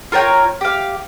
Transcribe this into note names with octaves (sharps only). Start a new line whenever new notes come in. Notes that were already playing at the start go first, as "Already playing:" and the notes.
F4 A#4 C#5 G5
G4 F5